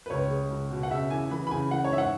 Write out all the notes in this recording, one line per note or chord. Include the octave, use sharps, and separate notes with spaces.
B4
C#2 C#5
G#3
C#2
B2
F#5
C#3 E5
E2 G#5
E3 B5
B5
C#3 G#5
E3 F#5
C#5
G#2 E5
F#5